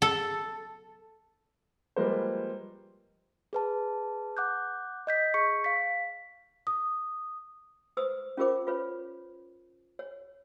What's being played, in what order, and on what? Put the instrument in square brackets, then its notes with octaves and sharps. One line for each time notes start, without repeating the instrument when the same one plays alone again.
[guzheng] A4
[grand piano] F3 G3 G#3 A#3 B4 C5
[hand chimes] G#4 B4 A5
F#5 D6 F#6 G6
D#5 G6 B6
G#4 C#6 C#7
F5 B6
[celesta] D#6
[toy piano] B4 C5 D#6 E6
C#4 F4 G4 A#4 C5 D6
F4 B4 C#5
C#5